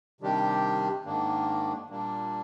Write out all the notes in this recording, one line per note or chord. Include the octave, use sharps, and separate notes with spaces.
C3 D#3 G3 D4 G4
G#2 D#3 A#3 D4
A#2 G3 A#3 D4